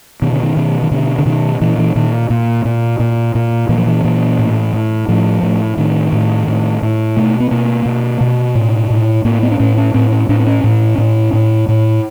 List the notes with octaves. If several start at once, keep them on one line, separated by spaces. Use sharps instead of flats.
B2 D#3
D3
D#3
B2
D#3
B2 D3
D3
B2 D#3
A#2 E3
E3
A#2 D#3
A#2
A#2
A#2
A#2
A#2 E3
F3
E3
A#2
A2
A2
A2 F3
A2
A2 D#3
A2
A2
A2
B2 A3
B3
B2 A#3
B2
B2
A2
A2
A2 A#3
B3
D4
A2 C#4
C#4
A2 C4
C#4
A2 D4
C4
C#4
A2
A2
A2
A2